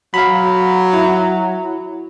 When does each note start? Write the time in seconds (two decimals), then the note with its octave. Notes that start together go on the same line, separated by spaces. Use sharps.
0.14 F#3 F5 B5
0.93 E4